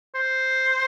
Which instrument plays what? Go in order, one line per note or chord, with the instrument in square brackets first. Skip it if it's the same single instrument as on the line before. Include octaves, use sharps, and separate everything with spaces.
[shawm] C5